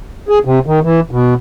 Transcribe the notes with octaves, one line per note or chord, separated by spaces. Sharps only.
G#4
C3
D#3
E3
B2